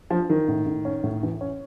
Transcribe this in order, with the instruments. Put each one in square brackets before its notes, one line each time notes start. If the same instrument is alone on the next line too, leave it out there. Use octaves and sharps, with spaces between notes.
[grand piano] F3 [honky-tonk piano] D4
[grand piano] D#3 [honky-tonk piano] E3
[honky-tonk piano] A2
A2
C#4
A2
E3
C#4